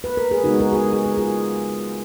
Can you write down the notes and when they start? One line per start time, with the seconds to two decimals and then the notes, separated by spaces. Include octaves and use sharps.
0.04 B4
0.17 A#4
0.31 G#4
0.44 C#3 G#3 B3 D#4 F#4
0.60 F#4 A#4
0.72 G#4
0.76 F#4 A#4
0.93 G#4
1.06 A#4
1.17 F4 G#4